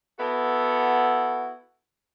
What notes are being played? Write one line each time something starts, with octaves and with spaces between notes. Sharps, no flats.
B3 E4 F#4 A4